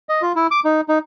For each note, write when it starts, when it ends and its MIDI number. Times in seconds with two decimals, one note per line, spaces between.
0.09 0.22 75
0.22 0.32 65
0.36 0.47 64
0.51 0.60 86
0.65 0.81 63
0.89 0.98 63